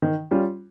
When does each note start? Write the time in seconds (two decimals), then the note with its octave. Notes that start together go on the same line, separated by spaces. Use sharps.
0.02 D#3
0.31 G3 C#4 F4